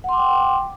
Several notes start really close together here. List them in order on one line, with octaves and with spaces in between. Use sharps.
F#5 C6 D6 G5